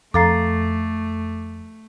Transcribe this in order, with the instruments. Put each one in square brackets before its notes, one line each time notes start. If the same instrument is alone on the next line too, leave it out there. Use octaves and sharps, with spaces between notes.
[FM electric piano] F2 [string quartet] A3 [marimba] A4 F5 A#5 [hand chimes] D6 A6 C7